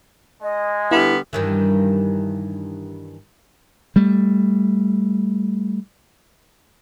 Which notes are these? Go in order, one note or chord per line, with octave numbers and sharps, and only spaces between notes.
G#3 D#5
D3 G3 B3 E4
G2 D#3 E3
G3 A3